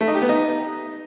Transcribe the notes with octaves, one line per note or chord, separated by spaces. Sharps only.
A3
D#4
G4
B3
D#4